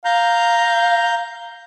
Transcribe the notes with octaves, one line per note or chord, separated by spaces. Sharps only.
F5 A#5 G6